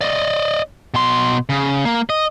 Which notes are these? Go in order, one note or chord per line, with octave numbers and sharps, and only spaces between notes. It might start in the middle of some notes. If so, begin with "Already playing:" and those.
D5 D#5
B2 C6
C#3
A#3
D#5